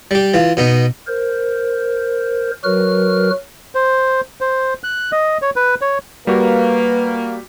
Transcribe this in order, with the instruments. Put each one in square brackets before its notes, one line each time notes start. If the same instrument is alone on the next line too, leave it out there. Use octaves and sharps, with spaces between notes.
[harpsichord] G3 G4
E3 F4
B2 B3 D#4
[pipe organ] A#4 C5
F#3 F#4 A#4 B4 F6
[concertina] C5
C5
F#6
D#5
C#5
B4
C#5
[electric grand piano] G3 F#4 [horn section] A#3 [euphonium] B4